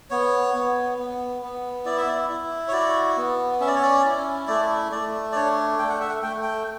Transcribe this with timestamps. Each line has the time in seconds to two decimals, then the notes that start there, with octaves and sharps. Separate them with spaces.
0.10 B3 C#5
0.54 B3
0.98 B3
1.42 B3
1.85 E4 D5
1.97 E5
2.08 D5
2.29 E4
2.68 C#5
2.73 F#4 D5
3.17 B3
3.60 C#4 E5
3.67 D5
3.75 C#5
3.83 D5
4.05 E4
4.47 A3 D5
4.92 A3 D5
5.32 D5
5.36 D4 C#5
5.79 A3 G5
5.89 F#5
6.00 E5
6.09 F#5
6.22 A3 G5
6.43 G5